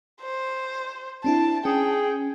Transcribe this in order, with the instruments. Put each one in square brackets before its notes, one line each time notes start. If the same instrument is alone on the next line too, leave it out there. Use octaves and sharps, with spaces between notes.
[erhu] C5
[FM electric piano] C4 D4 E4 [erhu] A5
[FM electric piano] C#4 [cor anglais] G#4 [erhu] G5